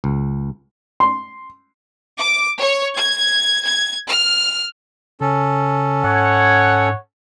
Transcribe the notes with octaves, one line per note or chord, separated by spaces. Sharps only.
C#2
C6
D6
C#5
G#6
G#6
F6
C#3 C#4 A4
G#2 C#5 F#5